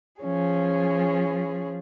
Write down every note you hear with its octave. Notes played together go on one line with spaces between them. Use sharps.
F3 C#4 G#4